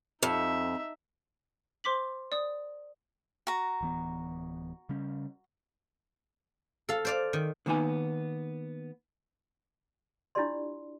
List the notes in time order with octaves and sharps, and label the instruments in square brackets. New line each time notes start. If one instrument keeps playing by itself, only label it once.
[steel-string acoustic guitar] F2 [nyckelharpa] D#4 E5
[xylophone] C5 C6 D6 B6 F#7
D5 D#6
[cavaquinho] F#4 A#5
[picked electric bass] D1 E3 B3
C#3 G3 C#4
[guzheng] A4 F5
C5 D5 F5
D#3
[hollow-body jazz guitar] D3 D#3 A#3 B3 D#4 G#5
[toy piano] D4 E4 F4 G4 D5 C6